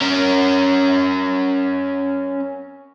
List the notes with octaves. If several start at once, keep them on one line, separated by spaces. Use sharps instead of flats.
C#4 A#4